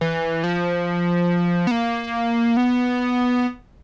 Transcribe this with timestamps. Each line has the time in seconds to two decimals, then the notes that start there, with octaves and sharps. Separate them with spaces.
0.01 E3
0.44 F3
1.67 B3
1.71 A#3
2.57 B3